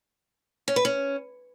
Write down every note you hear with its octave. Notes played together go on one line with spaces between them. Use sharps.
C#4
B4
C#4